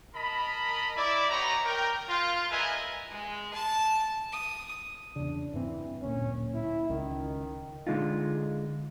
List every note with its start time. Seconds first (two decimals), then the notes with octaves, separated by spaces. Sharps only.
0.14 A#4 D#5 A5 B5
0.95 E4 D5
1.30 B3 D#4 G4 C#5 A#5
1.64 A#4 G5
2.08 F4
2.50 G#4 A#4 B4 D#5 E5 G#5
3.11 G#3
3.54 A5
4.32 D#6
5.16 E2 C#3 D4
5.54 G2 E3 C4
6.02 D1 A#2 C#4
6.54 E4
6.90 C#2 D#3
7.87 D3 G#3 D#4 F4